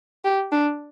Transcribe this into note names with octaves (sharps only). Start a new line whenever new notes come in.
G4
D4